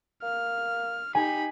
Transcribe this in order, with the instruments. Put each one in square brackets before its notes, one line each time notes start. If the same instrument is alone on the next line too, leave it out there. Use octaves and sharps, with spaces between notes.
[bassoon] A#3 [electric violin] F6
[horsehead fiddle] D#4 G4 [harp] G#5 [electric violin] B5